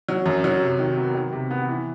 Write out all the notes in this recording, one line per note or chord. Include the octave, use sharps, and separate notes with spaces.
F#3
F#2
F#3
C3
D#3
B3
D#3
C3
B3
E3